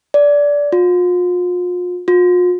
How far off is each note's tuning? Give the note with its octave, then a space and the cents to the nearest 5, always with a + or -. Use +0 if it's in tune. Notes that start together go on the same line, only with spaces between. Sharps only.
D5 -15
F4 +40
F4 +45